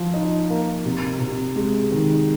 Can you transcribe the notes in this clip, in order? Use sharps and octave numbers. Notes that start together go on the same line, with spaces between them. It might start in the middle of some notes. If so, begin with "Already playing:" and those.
Already playing: F3
D#4
A#3
C3
C3
G#3
D#3